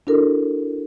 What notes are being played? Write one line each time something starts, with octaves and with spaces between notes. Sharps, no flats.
D4 E4 F#4 A4 A#4